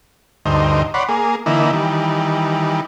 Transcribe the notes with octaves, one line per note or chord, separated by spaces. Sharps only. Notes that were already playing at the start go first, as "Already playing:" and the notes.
D2 G2 D#4 C5
C#5 D5 F#5 B5 C6
A#3 G#4
D3 E3 A#3 D#4 E4
D#3 E3 G3